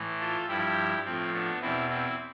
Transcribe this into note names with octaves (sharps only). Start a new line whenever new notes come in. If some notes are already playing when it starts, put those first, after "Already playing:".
Already playing: A2 E3
F4 A4
G2 F3 E4 G4
A2 F3 C4
B3 D4
E2 B2 C4 E4
C4 E4